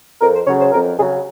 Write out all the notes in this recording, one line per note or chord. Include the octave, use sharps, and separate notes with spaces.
F2 A#4
C5
C#3 F#3 C#5
C5
F2 A#4
C#3 F#3 G#4